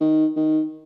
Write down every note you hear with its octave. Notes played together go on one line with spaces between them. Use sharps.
D#3
D#3